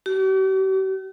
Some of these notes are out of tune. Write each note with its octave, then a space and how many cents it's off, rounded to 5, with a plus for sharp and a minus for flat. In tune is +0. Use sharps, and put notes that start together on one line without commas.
G4 -45